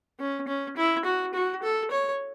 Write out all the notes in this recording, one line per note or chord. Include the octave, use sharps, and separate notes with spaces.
C#4
C#4
E4
F#4
F#4
A4
C#5